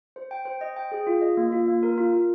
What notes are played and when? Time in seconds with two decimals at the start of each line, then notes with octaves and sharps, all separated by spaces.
0.16 C5
0.31 G5
0.45 C5
0.61 D#5
0.76 G5
0.92 G#4
1.07 F4
1.22 D#5
1.37 A#3
1.52 F4
1.68 A#3
1.83 A#4
1.98 F4
2.13 F4